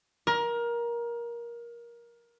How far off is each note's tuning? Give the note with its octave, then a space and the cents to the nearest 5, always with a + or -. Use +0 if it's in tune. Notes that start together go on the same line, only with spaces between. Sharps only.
A#4 +20